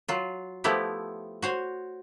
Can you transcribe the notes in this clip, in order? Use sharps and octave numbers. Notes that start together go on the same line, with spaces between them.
F#3 F4
F3 A3 B3 E4 G4
F#4 C5 C#5